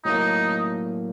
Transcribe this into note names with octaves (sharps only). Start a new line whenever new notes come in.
A2 F#3 A#3 D#4